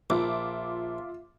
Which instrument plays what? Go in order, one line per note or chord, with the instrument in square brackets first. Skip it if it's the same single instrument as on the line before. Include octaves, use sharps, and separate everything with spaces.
[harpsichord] A#1 [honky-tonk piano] F4 E5 D6